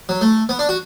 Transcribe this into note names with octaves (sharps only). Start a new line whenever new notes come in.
F#3
A3
B3
D4
F#4